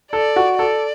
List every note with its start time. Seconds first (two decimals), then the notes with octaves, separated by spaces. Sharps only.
0.13 A4 D5
0.36 F#4
0.59 A4 D5